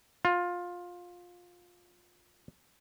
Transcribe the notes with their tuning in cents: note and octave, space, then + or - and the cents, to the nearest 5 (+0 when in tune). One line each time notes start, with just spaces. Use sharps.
F4 +15